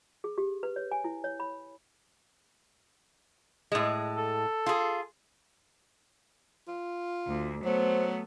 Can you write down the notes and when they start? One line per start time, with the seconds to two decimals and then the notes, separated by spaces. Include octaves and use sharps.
0.24 G#4
0.38 G4
0.63 B4
0.76 C#5
0.92 G#5
1.04 E4
1.24 C#5
1.40 B5
3.72 A2 G#3
4.17 A4
4.66 F4 G#4
6.68 F4
7.27 D2
7.65 F#3 A3 B3 C5